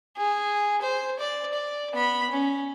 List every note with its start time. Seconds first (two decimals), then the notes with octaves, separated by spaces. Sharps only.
0.17 G#4
0.82 C5
1.19 D5
1.53 D5
1.93 B3 B5
2.30 C#4